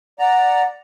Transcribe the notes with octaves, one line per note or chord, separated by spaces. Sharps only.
D5 F#5 A#5